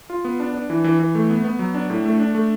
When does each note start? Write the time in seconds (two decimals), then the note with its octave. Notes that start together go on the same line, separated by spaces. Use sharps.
0.10 F4
0.25 B3
0.40 D4
0.54 D4
0.70 E3
0.84 E3
1.00 E3
1.15 A3
1.30 B3
1.44 B3
1.59 F#3
1.74 D4
1.90 A2
2.05 A3
2.20 D4
2.35 A3